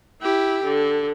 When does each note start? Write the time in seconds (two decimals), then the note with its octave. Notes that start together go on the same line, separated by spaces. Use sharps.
0.21 E4 G4
0.64 D3